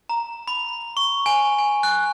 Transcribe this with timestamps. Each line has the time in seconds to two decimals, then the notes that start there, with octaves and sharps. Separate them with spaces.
0.09 A#5
0.48 B5
0.97 C#6
1.26 G#5
1.59 G#5
1.83 F#6